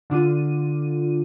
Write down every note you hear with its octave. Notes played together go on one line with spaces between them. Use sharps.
D3 D4 F4 D#7